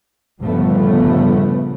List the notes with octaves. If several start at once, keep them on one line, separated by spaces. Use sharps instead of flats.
G1 A#2 C#3 F3 A3 B3